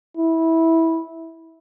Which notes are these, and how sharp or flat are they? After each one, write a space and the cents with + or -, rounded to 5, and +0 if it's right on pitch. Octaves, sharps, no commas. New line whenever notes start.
E4 -15